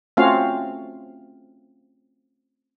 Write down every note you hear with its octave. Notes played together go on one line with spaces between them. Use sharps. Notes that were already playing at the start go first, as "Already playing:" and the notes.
A3 C4 C#4 F4 F#4 F5